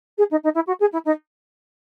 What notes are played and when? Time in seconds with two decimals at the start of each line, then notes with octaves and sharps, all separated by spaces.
0.18 G#4
0.31 D#4
0.43 D#4
0.54 E4
0.67 F#4
0.80 G#4
0.92 E4
1.05 D#4